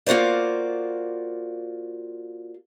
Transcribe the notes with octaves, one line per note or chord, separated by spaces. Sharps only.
A#3 F4 F#4 C5 D5